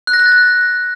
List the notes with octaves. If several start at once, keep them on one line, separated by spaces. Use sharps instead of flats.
F#6
A#6
F#6
A6
F#6